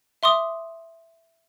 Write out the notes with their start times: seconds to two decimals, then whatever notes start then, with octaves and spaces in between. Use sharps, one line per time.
0.23 E5 C6 D6 D#6